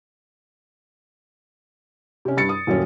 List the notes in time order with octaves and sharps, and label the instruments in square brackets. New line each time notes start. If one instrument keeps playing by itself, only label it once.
[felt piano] C3 C#4
G2 A6 C#7
D#6
D#1 F#2 C#4